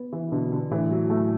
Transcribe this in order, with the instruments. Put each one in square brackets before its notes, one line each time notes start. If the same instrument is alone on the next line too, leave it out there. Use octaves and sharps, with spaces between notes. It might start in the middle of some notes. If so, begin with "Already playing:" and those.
Already playing: [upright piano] B3
E3
[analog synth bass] B2 [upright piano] D3
[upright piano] D3
[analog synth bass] A2 [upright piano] E3
[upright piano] F#3
A3